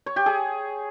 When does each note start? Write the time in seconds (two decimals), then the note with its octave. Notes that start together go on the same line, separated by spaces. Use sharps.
0.06 C#5
0.16 G4
0.26 G#4